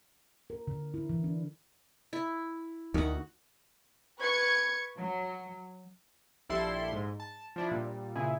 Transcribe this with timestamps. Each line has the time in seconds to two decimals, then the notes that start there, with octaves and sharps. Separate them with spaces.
0.50 A#4
0.67 D3
0.94 E4
1.10 E3
1.24 D4
2.13 E4
2.94 D2 D#3 F#4 F#5
4.19 B4 C#6 G#6 C#7
4.96 F#3
6.49 A#1 G3 E4 A4 C6
6.92 G#2
7.20 A5
7.56 F3 D4 E4
7.71 A#2 G3
8.15 A#2 C#3 E4 G#4